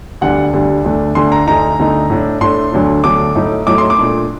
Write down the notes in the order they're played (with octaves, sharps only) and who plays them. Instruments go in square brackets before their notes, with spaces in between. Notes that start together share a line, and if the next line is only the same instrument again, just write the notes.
[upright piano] D2 D3 G3 D4 F#5
D2 D3 G3 D4
D2 D3 A3 D4
D2 D3 A3 D4 C6
A#5
D2 D3 A3 D#4 A#5
D2 D3 A3 D#4
A2 A3 D4
A2 A3 D4 C6
D2 D3 F#3 A3 D4
D2 D3 F#3 A3 D4 D6
A2 F#3 A3 D#4
A2 F#3 A3 D#4 D6
C6
D6
A#2 A3 D4